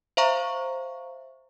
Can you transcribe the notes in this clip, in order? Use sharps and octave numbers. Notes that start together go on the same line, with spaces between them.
C5 E5 F5 A#5 C#6